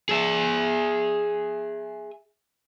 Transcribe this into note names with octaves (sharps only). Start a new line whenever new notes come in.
G#4 E5